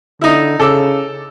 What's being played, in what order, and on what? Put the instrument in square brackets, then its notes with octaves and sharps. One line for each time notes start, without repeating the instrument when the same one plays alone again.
[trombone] D3 [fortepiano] D#4 E4
[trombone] C#3 [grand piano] A4 D6 E6